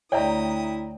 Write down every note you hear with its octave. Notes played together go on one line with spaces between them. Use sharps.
D2 E4 C#5 D5 E5 G5 A#5 D#6